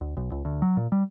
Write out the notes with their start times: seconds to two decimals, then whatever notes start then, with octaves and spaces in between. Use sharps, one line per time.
0.01 D2
0.17 B1
0.32 C#2
0.45 D2
0.62 F#3
0.77 A#2
0.92 G3